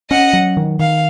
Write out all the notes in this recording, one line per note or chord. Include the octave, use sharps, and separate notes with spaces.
C#4 D#5 F#5
F#3
D#3
D#3 F5